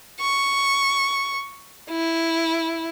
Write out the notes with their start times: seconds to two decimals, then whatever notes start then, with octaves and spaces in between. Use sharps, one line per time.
0.21 C#6
1.91 E4